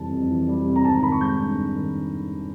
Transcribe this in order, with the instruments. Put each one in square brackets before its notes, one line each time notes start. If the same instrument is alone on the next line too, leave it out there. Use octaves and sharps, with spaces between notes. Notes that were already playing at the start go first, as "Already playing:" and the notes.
Already playing: [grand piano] F2 C3 E3 G3 A5
F2
E3
G3
C3
A#5
G#1 A5
A#5
D#3 B5
C#6
G#3 G6
G2
G#1
D#3